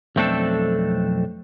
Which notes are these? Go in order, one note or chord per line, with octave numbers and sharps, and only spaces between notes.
B1 F2 A3 C4 D4 A4